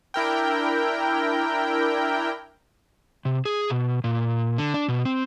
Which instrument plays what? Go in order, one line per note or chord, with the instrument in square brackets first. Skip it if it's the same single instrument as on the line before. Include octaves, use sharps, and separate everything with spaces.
[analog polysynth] D4 E4 A#4 G5
[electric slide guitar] C3
G#4
B2
A#2
D3
D4
B2
C4